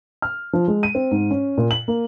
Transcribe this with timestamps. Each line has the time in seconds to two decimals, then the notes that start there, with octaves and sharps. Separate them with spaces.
0.22 F6
0.53 F3
0.68 G#3
0.83 D#7
0.95 C4
1.11 G#2
1.31 C#4
1.57 A#2
1.71 F#7
1.88 A#3